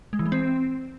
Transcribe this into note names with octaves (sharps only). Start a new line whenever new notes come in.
G#3
E3
G#3
C4